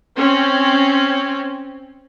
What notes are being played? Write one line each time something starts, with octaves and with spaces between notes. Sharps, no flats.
C4 C#4